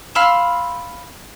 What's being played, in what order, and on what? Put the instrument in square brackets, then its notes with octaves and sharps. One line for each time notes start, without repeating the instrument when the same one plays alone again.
[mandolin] F5 B5 C6 E6